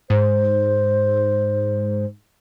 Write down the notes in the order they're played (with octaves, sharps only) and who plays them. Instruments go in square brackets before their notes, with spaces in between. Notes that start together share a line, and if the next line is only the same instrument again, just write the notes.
[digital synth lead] G#2 [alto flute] C5